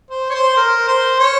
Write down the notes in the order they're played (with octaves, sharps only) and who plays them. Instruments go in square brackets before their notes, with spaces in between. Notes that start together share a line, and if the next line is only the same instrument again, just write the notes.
[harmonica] C5
C#5
C5
A#4
C5
C#5